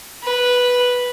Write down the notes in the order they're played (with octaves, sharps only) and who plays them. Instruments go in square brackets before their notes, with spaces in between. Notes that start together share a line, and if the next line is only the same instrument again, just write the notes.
[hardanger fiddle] B4